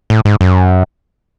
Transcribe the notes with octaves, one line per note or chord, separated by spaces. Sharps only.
A2
G#2
F#2